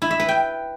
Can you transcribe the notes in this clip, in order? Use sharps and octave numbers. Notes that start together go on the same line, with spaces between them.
E4
E5
B4
G5